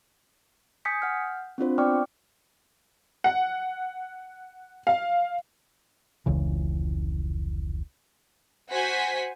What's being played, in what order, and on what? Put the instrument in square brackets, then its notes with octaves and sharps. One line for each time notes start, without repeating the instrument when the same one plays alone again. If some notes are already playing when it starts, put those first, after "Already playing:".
[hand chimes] G#5 D#6 G6 G#6 B6 C#7
F#5 F6 G6
C4 D4 F4 C5
B3 D5 G5 C#6 D6 F6
[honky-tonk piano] F#5
F5
[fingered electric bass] F1 C#2 C#3 E3
[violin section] F#4 C5 F#5 G#5 B6